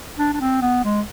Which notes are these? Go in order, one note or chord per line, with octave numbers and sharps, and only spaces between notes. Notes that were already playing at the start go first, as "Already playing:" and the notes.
D4
D4
C4
B3
G#3